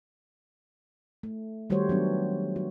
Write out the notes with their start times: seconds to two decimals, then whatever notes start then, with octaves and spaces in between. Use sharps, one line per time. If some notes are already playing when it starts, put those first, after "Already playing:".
1.23 A3
1.70 D#3 G3 A3 F#4 C5 C#5
1.89 F#3 B3 D4
2.56 F#4